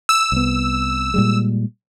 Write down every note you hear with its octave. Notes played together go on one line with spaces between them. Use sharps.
E6
C2 B3
A#2 G3 G#3